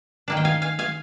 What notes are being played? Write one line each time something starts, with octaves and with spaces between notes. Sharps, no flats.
D#3 A#3 D4
G5
F5 G#5
F5 G#5
F5 G#5